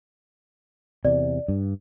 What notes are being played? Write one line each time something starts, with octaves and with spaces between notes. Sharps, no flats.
E2 C3 D5
G2